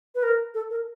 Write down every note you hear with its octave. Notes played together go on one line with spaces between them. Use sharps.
B4
A#4
A4
A#4